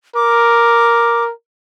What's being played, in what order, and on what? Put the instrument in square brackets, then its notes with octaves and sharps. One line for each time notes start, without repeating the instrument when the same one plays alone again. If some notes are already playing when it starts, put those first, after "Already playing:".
[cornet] A#4 [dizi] D6